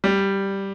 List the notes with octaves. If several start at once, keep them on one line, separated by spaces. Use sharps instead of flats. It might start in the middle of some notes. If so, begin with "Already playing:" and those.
G3